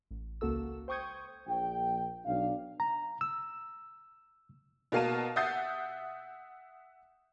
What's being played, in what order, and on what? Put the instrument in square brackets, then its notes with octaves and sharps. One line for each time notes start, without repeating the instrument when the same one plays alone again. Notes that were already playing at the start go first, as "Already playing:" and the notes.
[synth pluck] A1
C#2 A#3 F#4 A4 E6
C5 G5 C#6 D#6 G6 G#6
[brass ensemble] A#1 G5
B1 D4 F5
[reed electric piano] A#5
E6
[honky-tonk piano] B2 A#3 F5 A5 D#7
E5 F#5 D#6 G6 A6 C7